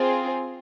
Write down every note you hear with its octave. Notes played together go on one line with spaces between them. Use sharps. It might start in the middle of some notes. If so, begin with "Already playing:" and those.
Already playing: C4 F4 G#4